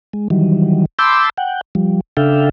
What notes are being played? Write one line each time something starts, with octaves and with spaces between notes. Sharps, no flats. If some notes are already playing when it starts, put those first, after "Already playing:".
G#3
D#3 E3 F#3 G3
A5 B5 C6 D6 E6 G6
F#5 G5
F3 G3
C#3 D4 A4 E5 F5 G5